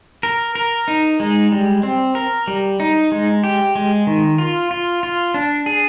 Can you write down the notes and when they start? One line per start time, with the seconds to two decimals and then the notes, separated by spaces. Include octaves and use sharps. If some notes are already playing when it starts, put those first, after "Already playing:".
0.23 A#4
0.55 A#4
0.88 D#4
1.20 G#3
1.52 G3
1.83 C4
2.15 A#4
2.47 G3
2.80 D#4
3.12 G#3
3.44 G4
3.75 G#3
4.07 D#3
4.38 F4
4.71 F4
5.03 F4
5.34 D4
5.66 G#4